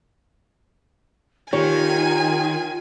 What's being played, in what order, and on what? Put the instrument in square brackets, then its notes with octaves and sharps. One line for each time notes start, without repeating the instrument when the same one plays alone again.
[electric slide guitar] D#3 [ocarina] F4 [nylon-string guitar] G4 C#5 [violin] G#5